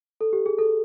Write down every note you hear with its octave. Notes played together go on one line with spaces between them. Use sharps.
A4
G4
G#4
A4